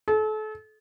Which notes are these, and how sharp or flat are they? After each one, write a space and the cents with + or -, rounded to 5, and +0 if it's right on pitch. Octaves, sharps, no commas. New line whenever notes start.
A4 -35